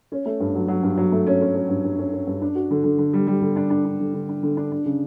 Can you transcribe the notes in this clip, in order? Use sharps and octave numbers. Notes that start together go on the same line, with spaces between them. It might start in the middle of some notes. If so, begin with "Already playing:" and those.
C#4
A3
G2
F#3
F#3
G2
F#3
A3
C#4
C#4
C#4
G2
G2
C#4
C#4
G2
D4
F#4
D3
D3
D3
G3
G3
D3
D4
D4
D4
D3
D3
D4
D3
D4
D4
C#3